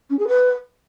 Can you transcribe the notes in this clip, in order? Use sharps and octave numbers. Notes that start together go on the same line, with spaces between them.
C#4
G#4
B4